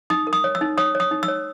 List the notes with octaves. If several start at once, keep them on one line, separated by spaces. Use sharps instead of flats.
D#4 D#6
A#4
D#6
C#5
E6
D#4
C#5 D#6
C#5
D#6
D#4
E6
C#5